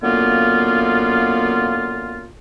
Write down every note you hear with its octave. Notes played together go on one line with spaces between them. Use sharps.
F#2 D3 A#3 B3 F4